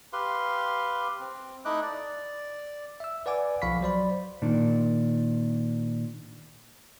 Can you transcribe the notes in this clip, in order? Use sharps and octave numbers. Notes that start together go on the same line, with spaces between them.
G4 B4 F5 C6
C4
A3 D#4 E4 D#5 D6 F#6
D5
E5 E6
B4 D5 F#5 G#5 D6
B1 F3 F5 B5 C#6 B6
F#3 C5 D5 B5
A#2 D#3 D4